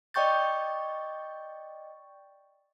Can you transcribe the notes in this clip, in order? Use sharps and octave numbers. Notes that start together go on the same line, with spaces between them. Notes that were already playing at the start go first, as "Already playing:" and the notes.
D5 D#5 G5 C#6 G6 A6